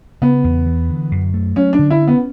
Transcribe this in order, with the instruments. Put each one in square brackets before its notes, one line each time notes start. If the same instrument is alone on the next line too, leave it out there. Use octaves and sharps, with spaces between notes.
[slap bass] C#3 [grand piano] B3
[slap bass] E2
E3
D3
F#2
A3
[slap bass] F#3 [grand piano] C#4
[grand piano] D4
[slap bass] D3
[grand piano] E4
[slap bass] C#4
[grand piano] B3